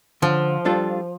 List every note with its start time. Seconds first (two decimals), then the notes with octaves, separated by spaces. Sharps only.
0.22 D3 F3
0.65 G3 D4 F4 A4